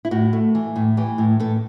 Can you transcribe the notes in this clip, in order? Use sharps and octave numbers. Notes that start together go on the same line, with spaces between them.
E4
A2 F#4
A3
E3
A2
E3 G4
A2
A2 A4